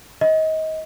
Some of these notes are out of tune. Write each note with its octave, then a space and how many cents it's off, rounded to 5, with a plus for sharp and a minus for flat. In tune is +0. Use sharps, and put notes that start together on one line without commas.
D#5 +25